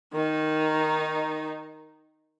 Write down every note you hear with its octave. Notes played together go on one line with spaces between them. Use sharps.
D#3 D#4